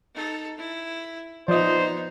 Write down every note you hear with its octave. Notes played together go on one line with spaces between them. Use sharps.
D#4 A4
E4
F3 B3 D#4 C5 D5 D#5